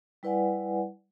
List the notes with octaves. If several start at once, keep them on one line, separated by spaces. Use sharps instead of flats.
G3 E4 B4 D5 F#5 G#5